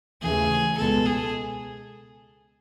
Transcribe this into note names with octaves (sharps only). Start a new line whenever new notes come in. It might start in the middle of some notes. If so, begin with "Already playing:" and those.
D#2 C#3 E3 A3 G#4
C#2 B2 G#3 B3 A4
G#4